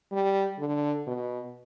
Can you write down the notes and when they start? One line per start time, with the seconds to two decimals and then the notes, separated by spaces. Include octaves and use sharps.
0.12 G3
0.59 D3
1.07 B2